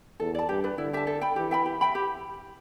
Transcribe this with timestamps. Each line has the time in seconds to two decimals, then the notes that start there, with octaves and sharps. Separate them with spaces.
0.20 E2 A4
0.35 D5 A5
0.49 G2 G4
0.64 B4 D5
0.78 D3 E4
0.93 G4 E5 A5
1.07 A4
1.21 G5 B5
1.36 E3 G4
1.51 E5 G5 B5
1.66 G4
1.81 E5 G5 B5
1.95 G4